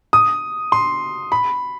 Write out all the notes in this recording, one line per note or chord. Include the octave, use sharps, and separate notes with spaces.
D#6
C6
B5